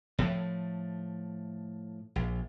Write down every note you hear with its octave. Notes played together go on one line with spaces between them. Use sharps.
A2 F3 A3
A#1